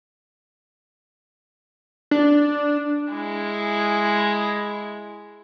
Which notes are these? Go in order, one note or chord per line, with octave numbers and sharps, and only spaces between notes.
D4
G#3 E4